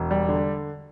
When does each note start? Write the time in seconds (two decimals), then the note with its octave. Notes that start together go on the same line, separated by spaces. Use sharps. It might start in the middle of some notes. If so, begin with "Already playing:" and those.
Already playing: E1
0.11 G3
0.29 D3